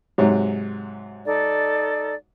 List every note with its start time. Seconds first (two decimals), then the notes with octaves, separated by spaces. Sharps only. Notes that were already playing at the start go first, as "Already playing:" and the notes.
0.18 G#2 C3 F#3
1.25 D#4 A4 D5